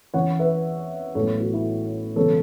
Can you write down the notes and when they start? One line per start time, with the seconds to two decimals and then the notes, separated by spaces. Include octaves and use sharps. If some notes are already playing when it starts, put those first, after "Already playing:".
0.14 E2 E3 C#4 C#5 F#5
0.39 B4 E5
1.15 A1 A2 F#3 B3 A4 C#5
1.40 F#4
1.53 E4 A4
2.16 E1 E2 C#3 F#3 B3 A4 C#5